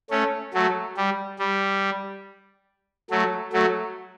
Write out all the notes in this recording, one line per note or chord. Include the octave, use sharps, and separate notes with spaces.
A3 C#4
F#3 A3
G3
G3
F#3 A3
F#3 A3